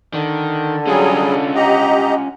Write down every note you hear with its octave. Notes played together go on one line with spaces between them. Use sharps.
D3 D#3
F#3 G3 C#4 F4 G#4
G4 D#5 F#5 A#5